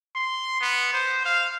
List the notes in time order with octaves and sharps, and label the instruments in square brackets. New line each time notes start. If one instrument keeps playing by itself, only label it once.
[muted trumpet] C6
B3
C5
F5